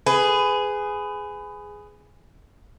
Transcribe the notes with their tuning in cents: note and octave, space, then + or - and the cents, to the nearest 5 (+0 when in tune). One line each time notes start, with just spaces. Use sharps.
G#4 +0 B4 +25